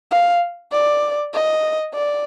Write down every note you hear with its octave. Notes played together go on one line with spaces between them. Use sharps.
F5
D5
D#5
D5